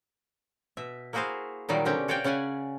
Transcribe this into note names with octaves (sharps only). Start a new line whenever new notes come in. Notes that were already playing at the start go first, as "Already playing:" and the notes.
B2 E5
A#3 E4 F#4 G#4 C5 F5
A#2 D#3 F#3 G3
B2 D3 C4 C#4 G4
F#4 C#5 D5 F5 G5
C#3 C#4 D5 F#5 G#5